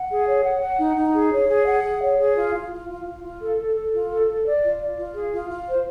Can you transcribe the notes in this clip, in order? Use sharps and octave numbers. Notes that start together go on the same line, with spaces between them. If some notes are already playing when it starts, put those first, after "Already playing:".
Already playing: F#5
G#4
C#5
F#5
F#5
D#4
D#4
G#4
C#5
G#4
F#5
G#4
C#5
G#4
F4
F4
F4
F4
F4
F4
A4
A4
A4
F4
A4
A4
D5
F4
D5
F4
G#4
F4
F4
C5